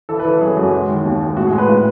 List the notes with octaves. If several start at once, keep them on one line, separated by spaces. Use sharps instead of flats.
E3 A4
B4
E3
A4
F#2 G#4
F#2 F#4
G#3
D#3
D#2
G#3
A2 F#4
G#4
G#3
B4
A2